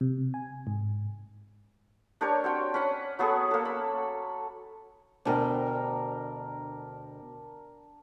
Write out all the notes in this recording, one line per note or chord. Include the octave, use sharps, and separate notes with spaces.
C3
G#5
G#2
D4 G4 A#4 C#5
C4 F#4 G5
C#4 B4 F#5
F#3 B3 G#4 A4
A#3 A4
B5
D2 B2 D4 A#4 G5